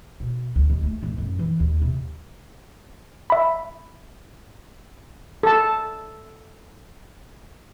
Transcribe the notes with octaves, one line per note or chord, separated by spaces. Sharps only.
B2
D2
D#2
A3
F2
F#2
E3
D#2
C3
E5 B5
A4 A5